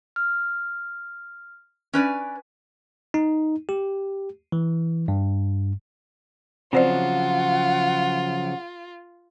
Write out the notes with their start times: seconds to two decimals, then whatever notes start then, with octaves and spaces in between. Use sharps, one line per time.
0.16 F6
1.93 C#4 B4 D5
3.14 D#4
3.69 G4
4.52 E3
5.08 G2
6.73 C#3 F3 F#3 C4 F4 C5 D5 F#5